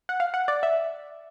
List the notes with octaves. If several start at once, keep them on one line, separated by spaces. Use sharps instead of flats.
F#5
F5
F#5
D5
E5